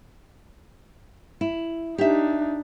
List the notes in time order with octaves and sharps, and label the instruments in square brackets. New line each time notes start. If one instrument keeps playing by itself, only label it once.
[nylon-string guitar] E4
[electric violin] D4 D#4 [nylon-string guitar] G4 E5